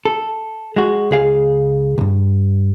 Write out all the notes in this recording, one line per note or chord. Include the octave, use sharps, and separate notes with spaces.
A4
G#3 F#4
C#2 G#4 F5
C2 G2